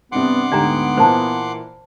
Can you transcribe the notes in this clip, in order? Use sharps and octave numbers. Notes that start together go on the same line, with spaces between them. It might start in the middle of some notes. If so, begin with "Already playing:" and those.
G2 C3 B3 D4 F#5 C6 D6
D2 G#2 B3 G4 D5 G#5 A#5
A#2 E3 C5 A5